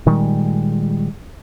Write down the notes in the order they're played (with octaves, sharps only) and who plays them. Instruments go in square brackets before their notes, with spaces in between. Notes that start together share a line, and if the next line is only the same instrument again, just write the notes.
[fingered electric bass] A#2 D#3 G3 G#3